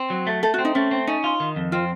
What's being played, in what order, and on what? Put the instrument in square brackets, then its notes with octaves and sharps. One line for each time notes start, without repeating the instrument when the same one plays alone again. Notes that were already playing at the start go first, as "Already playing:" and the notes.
Already playing: [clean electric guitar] C4
F#3
A3
[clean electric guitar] A3 [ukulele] A4
[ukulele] F#4
[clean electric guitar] C4
[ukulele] D#4
[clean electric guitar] A3 [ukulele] C#4
[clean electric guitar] C4
[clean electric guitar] C#4 [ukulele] D#4
[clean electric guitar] F4
D#3
F2
[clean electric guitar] C4 [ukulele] F4